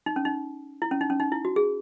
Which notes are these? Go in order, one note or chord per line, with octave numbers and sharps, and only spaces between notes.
D#4
C#4
D#4
E4
C#4
D#4
C#4
D#4
E4
F#4
G#4